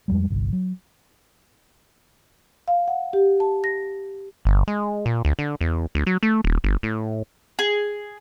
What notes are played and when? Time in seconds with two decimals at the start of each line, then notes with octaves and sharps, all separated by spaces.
0.08 F2 G3 G#3
0.30 G1 C2
0.53 F#3
2.68 F5
2.88 F#5
3.13 G4
3.40 A5
3.64 A#6
4.45 G1
4.68 G#3
5.06 A#2
5.25 D2
5.39 D3
5.61 E2
5.95 D2
6.07 F#3
6.23 A3
6.44 D#1
6.64 G1
6.83 A2
7.59 G#4